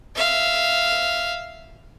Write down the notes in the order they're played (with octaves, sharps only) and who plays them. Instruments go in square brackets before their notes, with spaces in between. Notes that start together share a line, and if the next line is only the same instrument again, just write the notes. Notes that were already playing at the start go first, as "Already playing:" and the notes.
[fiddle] E5 F5